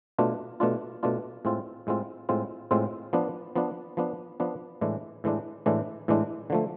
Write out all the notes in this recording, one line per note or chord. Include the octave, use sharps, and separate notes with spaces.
B2 A3 D4 F4
B2 A3 D4 F4
B2 A3 D4 F4
A2 G#3 C4 F4
A2 G#3 C4 F4
A2 G#3 C4 F4
A2 G#3 C4 F4
F3 B3 D4
F3 B3 D4
F3 B3 D4
F3 B3 D4
A2 E3 G#3 D4
A2 E3 G#3 D4
A2 E3 G#3 D4
A2 E3 G#3 D4
D3 F3 A3